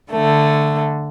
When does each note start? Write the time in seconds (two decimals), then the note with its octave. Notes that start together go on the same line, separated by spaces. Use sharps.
0.11 D3 A3